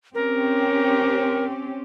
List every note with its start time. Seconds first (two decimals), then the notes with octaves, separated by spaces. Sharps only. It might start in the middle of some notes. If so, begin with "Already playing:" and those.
0.15 C4 C#4 G4 A#4